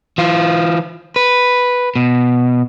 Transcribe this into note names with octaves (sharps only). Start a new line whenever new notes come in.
E3 F4
B4
B2